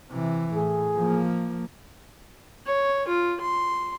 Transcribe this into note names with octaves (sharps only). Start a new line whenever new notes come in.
C3 E3
A2 G#4
F3 A#3
C#5
F4
C6